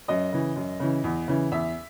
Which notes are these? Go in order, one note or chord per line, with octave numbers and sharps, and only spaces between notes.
F#2 D#5
C#3 E3
F#2
C#3 E3
E2
C#3 E3
E2 E5